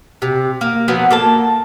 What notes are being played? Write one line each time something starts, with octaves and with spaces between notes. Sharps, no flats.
C3
A#3
F3 F#3 B3
A#3 A4 A5